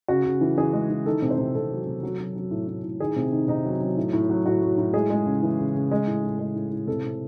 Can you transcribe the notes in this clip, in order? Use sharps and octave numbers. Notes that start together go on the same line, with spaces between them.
C#3 F#4
C#3
E3
E3 G#4
G#3
E3
D#3 A4
C3
C5
C3
C3 A4
F#3
C3
F#3
F#3
F#3
A2
A2
A2
D#3 G#4
C3
D#3
C3 D#4
F#3
F#3
A2
A2
F#3
A2 F#4
F#3
A2
G#3 G#4
G#3
C#3
E3
C#3
C#3
G#3
A2
A2
G#3
A2
A2
C3 A4
C3